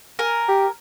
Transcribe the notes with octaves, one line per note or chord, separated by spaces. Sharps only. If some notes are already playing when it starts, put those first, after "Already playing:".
A#4 G#5
G4